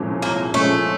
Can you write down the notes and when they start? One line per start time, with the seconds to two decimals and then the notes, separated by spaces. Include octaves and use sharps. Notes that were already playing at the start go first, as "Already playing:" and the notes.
Already playing: C2 A#2 F3 G#3 C#4
0.22 C2 A#3
0.54 A#2 F3 G#3 A3 C#4